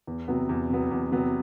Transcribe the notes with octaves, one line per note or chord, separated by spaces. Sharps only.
E2
C3 F#3 B3
E2
C3 F#3 B3
E2
C3 F#3 B3